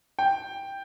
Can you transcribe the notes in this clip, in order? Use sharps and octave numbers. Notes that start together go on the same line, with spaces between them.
G5